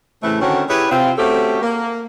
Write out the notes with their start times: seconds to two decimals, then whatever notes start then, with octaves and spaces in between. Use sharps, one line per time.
0.23 A2 C#3 E3 A3 C4 E4
0.42 D3 D#3 C4 C#4 F#4
0.69 E4 G4 G#4 B4 C#5
0.92 C3 C4 F4
1.18 A3 C4 C#4 F#4 G4 A4
1.62 A#3